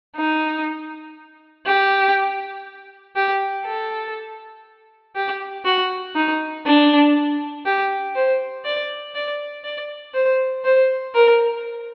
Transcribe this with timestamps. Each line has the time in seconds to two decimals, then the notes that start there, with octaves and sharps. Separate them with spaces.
0.16 D#4
1.66 G4
3.16 G4
3.65 A4
5.16 G4
5.65 F#4
6.15 D#4
6.66 D4
7.66 G4
8.15 C5
8.65 D5
9.15 D5
9.64 D5
10.14 C5
10.65 C5
11.15 A#4